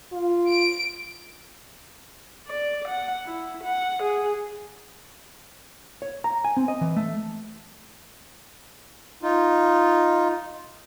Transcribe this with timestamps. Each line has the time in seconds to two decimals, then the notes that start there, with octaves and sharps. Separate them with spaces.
0.12 F4
0.50 D7
2.47 D5
2.88 F#5
3.26 E4
3.64 F#5
4.03 G#4
6.02 C#5
6.24 A#5
6.44 G#5
6.57 C4
6.68 D#5
6.81 E3
6.96 A3
9.23 D#4 F4